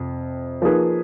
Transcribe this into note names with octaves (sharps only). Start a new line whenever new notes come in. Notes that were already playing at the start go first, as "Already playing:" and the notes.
Already playing: F2 C3
F3 A#3 D#4 G#4 B4